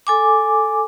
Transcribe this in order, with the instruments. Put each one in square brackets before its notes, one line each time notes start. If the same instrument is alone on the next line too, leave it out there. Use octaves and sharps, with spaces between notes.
[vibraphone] A4 G#5 D6